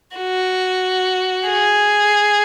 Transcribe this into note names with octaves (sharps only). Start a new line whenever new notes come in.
F#4
G#4